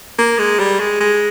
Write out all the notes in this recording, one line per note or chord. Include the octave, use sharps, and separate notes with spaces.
A#3
G#3
G3
G#3
G#3